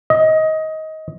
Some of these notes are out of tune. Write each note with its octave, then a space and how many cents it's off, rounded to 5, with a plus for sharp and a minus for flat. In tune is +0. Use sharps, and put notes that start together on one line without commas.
D#5 +20